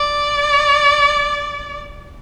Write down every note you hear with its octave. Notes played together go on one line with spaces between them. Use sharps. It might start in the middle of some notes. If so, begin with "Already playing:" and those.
Already playing: D5